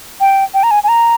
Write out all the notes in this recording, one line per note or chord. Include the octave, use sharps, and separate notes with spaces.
G5
G5
A#5
G#5
G#5
A#5